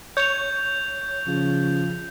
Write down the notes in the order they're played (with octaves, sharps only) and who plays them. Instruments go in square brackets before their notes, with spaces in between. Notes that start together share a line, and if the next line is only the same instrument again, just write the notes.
[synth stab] C#5 [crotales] G6 F7
[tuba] C#3 [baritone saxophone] F3